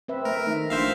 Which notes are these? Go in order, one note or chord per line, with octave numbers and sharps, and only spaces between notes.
C4 B4 E5
A3 A#4 E5
D#3 A3
A#1 C5 E5 F5